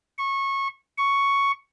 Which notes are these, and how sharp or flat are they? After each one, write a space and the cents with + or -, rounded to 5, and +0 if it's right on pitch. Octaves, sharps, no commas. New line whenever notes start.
C#6 -20
C#6 +5